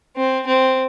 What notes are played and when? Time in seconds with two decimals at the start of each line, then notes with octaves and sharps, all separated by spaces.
0.16 C4
0.47 C4